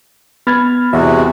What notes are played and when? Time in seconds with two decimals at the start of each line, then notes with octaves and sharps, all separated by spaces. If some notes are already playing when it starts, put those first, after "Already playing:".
0.47 B3 B5 F6 G#6 A6
0.93 E2 C3 G#3 F#4 E5